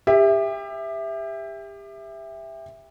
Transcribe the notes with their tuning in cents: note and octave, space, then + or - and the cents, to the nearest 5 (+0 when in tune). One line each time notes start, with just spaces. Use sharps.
G4 +30 E5 +0